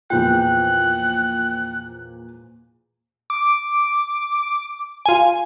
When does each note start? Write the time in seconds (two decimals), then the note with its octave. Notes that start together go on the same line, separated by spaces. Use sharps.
0.10 E2 A#2 F3 G5 F#6
3.30 D6
5.06 F4 G#5